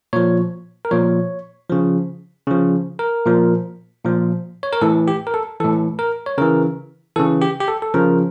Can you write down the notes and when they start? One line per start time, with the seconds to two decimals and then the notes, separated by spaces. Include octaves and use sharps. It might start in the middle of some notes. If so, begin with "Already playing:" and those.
0.13 A#2 F3 C#5
0.85 A#4
0.91 A#2 F3 C#5
1.69 C#3 F3
2.47 C#3 F3
2.99 A#4
3.26 A#2 F3
4.04 A#2 F3
4.63 C#5
4.73 A#4
4.81 A2 E3 A4
5.08 G4
5.27 A#4
5.34 A4
5.60 A2 E3 A4
5.99 A#4
6.26 C#5
6.38 C#3 E3 A#4
7.16 C#3 E3 A4
7.42 G4
7.60 G4
7.68 A4
7.82 A4
7.94 C#3 F3 A#4